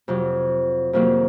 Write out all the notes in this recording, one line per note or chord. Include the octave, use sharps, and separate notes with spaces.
F2 C3 F#3
F2 C3 D#3 F#3 A#3